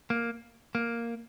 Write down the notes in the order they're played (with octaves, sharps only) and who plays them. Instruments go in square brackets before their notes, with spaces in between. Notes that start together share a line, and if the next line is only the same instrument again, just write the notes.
[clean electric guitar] A#3
A#3